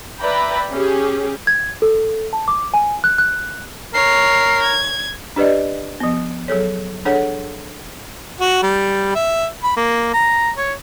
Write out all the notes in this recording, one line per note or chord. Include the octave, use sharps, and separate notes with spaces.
B4 D5 E5 G5 A#5 B5
C#4 G4 G#4
G#6
A4
A5
D6
G#5
F#6
F#6
A#4 C#5 C7
G#6
D4 G4 B4 D5 D#5
F3 B3
F#3 G#4 A4 C#5
D4 G#4 A4 C#5 F#5
F#4
G3
E5
B5
A#3
A#5
C#5